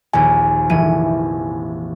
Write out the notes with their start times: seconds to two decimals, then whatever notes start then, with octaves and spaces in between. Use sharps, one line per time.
0.13 A#1 D#2 G#5
0.70 F1 E3 D#7